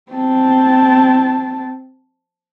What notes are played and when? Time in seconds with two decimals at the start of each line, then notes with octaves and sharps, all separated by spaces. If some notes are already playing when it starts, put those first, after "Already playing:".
0.12 C4 A5